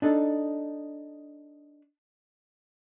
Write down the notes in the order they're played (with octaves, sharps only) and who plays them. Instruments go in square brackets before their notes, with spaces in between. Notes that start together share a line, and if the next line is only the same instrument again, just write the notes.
[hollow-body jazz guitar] D4 D#4 A4